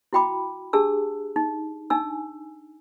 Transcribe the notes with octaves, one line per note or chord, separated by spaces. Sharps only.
E4 F#4 G5 B5 D6
D4 G4 G#4 A5 E6
D#4
D4 D#4 G#5 E6